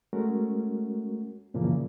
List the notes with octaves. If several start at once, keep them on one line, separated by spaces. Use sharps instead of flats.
G#3 A3 C#4 F#4 A#4
F#2 A#2 C#3 E3 F3 A#3